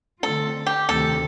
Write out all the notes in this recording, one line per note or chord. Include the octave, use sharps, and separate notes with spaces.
D3 A3 C4 F4 A4
G4
D2 C3 D#3 A4